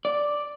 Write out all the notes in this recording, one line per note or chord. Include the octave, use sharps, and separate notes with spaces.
D5